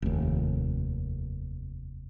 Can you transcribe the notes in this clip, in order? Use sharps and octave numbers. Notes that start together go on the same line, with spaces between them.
F1 D#2